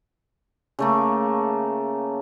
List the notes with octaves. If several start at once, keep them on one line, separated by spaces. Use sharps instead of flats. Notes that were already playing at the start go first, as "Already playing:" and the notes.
C#3 A3 A#3